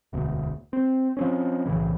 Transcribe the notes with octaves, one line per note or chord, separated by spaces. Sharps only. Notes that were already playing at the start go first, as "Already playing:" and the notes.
E1 D2 B2
C4
F3 C4 C#4
B1 A2 C#3 E3